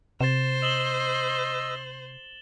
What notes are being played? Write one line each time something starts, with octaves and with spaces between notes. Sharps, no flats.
C3 C5 A6 E7
D#5 E6 E7 F#7 G7